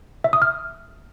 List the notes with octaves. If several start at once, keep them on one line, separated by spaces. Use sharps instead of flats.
E5
D#6
F6